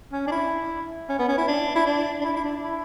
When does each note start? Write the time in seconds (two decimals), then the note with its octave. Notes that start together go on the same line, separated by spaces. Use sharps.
0.13 C#4
0.27 D4
0.32 E4
1.09 C#4
1.19 B3
1.29 C#4
1.38 E4
1.48 D4
1.76 E4
1.86 D4
2.21 D4
2.25 E4
2.36 E4
2.44 D4
2.63 E4